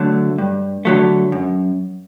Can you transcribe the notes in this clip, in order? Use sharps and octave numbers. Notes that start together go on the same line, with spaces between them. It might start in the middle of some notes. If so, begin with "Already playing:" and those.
Already playing: D3 F#3 A3
G2
D3 F#3 A3
F#2